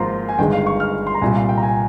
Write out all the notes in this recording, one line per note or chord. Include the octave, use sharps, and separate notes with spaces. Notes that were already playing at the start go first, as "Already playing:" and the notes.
Already playing: G#1 G#2 F3 A#3 F4 A#5 C6
G#5
G1 G2 D#3 G#3 G5
F5
C#6
F6
C6
A#5
C2 A#2 G3 G#5
F5
G5
A#5
G#5